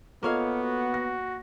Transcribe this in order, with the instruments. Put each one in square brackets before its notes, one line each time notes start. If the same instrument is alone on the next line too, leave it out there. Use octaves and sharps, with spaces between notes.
[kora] A#3 C#5 F5 [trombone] B3 [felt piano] F4 A4 D#5
[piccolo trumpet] F#4
[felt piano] A#6